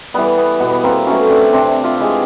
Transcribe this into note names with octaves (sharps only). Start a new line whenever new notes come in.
E3 G3 B3
B3
B2 B3
A#3 C4
F#3 A3 B3 C#4
C4 D4
C3 C4 D4
F4 G4
E3 G#3 G#4